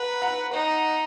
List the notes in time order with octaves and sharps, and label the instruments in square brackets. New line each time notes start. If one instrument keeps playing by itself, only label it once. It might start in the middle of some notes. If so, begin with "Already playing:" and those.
Already playing: [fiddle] B4 [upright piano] F#5 A#5
[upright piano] F#5 A#5
[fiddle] D#4